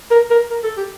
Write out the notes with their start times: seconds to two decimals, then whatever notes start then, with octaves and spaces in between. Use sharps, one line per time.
0.11 A#4
0.31 A#4
0.50 A#4
0.63 A4
0.77 G4